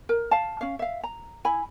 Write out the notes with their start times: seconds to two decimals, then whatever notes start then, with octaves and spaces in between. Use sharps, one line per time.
0.09 A#4
0.31 F5 A5
0.61 C#4 F5
0.79 E5 F5
1.03 A#5
1.45 E4 G#5 B5